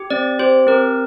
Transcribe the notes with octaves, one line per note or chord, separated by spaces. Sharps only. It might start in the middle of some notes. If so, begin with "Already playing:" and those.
Already playing: G4
C4 D5
G4 C5
C4 A#4